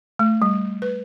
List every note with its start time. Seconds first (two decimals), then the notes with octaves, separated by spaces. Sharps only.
0.19 A3
0.42 G3
0.82 B4